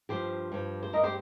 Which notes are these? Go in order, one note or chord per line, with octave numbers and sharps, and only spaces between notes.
G2 F3 G4 C5
G2 F3
C5
G2 G3 A#4 D#5
G4 C5